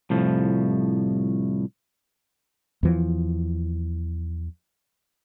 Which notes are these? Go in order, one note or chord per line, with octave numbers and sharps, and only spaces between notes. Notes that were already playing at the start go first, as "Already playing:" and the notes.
C2 A2 F3
E2 E3 F3